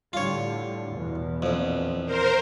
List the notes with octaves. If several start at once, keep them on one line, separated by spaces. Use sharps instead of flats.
A2 D3 G3 F4 C#5
E2 B2
A#1 F2
A#4 C5